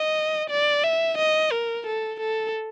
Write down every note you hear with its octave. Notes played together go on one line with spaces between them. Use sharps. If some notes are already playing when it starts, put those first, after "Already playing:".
Already playing: D#5
D5
E5
D#5
A#4
A4
A4